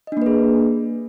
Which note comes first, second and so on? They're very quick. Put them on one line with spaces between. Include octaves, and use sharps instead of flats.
D#5 D4 A#3 B4 G#4